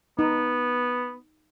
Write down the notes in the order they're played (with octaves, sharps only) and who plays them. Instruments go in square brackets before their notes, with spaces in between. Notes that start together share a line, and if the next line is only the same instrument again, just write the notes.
[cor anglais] B3 [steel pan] D#4